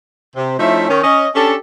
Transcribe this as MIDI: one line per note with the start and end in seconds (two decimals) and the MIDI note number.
0.36 0.53 48
0.59 0.88 53
0.59 0.88 57
0.59 0.88 61
0.59 0.88 63
0.59 0.88 64
0.59 0.88 76
0.88 1.01 51
0.88 1.01 61
1.04 1.28 61
1.04 1.28 75
1.35 1.55 61
1.35 1.55 62
1.35 1.55 67
1.35 1.55 69